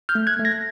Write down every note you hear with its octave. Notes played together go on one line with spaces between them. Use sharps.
F6 G6
A3
F#6 G#6
A3
G#6 A#6